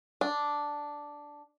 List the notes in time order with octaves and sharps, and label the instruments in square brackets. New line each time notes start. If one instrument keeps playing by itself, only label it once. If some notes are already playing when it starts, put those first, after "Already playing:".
[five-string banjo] D4